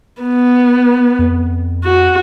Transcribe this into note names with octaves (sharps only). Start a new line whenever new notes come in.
B3
F2
F#4